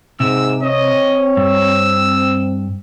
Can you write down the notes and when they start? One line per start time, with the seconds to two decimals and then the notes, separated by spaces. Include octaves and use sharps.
0.20 G#2 C3 E6
0.63 C4 C#5 D#5
1.37 G2 E6